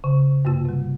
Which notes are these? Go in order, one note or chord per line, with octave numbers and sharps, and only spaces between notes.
C#3
G2 C3 A#3 F4
C3 G3